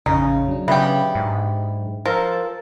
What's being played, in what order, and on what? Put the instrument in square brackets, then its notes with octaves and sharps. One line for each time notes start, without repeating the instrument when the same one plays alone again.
[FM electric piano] A1 F2 C#4 [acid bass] C#3 [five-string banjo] D#4
[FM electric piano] F#3 D4
[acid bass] C#3 [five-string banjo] B3 G4 [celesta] E5 G5
[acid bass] G#2
[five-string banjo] F3 [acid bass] A#4 [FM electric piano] E6 A6